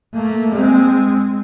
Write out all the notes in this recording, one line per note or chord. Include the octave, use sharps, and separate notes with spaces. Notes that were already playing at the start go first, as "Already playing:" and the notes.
A3 A#3
G#3 C4